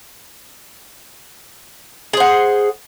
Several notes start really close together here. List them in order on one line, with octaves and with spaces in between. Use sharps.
G#4 C5 F#5